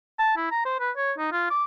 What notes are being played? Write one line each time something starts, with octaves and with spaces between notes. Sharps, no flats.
A5
E4
A#5
C5
B4
C#5
D#4
F4
D6